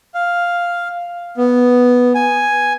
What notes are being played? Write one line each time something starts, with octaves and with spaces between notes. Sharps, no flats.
F5
B3
G#5